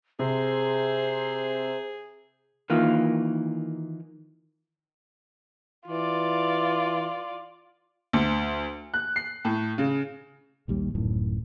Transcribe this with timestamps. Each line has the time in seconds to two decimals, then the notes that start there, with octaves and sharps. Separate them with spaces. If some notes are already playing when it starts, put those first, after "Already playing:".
0.19 C3 G#4 C5
2.70 D#3 E3 A#3 F4
5.88 E3 F4 D5
8.13 D2
8.94 F#6
9.16 C7
9.45 A2
9.78 C#3
10.68 A#1 D#2 G3
10.95 D1 F#2 A2 D#3